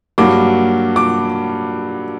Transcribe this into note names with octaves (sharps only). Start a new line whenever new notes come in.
G2 F#3 A#3 D6
D6